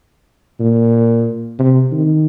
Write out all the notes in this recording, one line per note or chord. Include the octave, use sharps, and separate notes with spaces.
A#2
C3
D#3